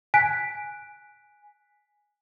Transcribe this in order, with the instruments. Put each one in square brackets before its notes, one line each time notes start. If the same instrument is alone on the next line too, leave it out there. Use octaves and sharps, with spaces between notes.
[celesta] G#5 F#6 B6 D7